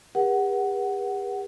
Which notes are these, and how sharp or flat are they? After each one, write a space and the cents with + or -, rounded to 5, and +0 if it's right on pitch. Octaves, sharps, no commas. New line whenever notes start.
G4 +45 A#4 +45 F#5 +10